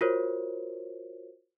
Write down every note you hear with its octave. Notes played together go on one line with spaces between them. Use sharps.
F4 F#4 A#4 C5 C#5